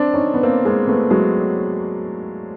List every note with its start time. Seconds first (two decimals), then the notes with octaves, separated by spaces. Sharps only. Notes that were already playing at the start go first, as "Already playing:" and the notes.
Already playing: C4 D4
0.14 C#4 D#4
0.34 B3
0.43 A#3 C4
0.65 G#3 A#3
0.87 A3 B3
1.11 F#3 G#3